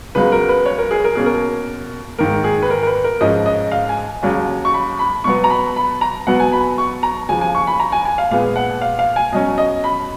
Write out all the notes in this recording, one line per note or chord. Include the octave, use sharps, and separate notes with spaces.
C#2 C#3 F#3 B3 B4
A#4
B4
C#5
A#4
G#4
A#4
B2 A#3 C#4 G#4
A#4
G#2 D#3 A#3 A#4
G#4
B4
A#4
A#4
B4
A#4
G#2 F3 G#3 C#4 D#5
D#5
F5
G#5
D#2 C#3 F#3 C#4
C#6
B5
B5
B2 F#3 B3 C#6
A#5
B5
B5
A#5
B2 F#3 B3 F#5
G#5
B5
C#6
A#5
D#2 C#3 F3 G#5
G#5
C#6
B5
A#5
G#5
G#5
F5
A#2 G#3 B3 F5
F#5
F5
F5
G#5
B2 F#3 C#4 D#5
D#5
B5